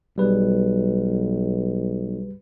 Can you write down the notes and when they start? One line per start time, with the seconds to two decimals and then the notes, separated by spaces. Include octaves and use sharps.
0.18 B1 G3 G#4 B4